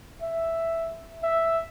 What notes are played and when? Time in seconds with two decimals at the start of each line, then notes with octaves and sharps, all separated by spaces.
0.22 E5
1.23 E5